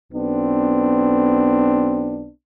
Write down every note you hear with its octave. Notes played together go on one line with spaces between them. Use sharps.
B1 B3 C4 D4